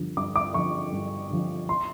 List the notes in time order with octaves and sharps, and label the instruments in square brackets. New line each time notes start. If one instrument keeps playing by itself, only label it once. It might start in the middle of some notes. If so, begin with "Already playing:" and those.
Already playing: [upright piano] G2 D3 F3
G2 D6
D6
D3 F3 C#6
G2
D3 F3
C6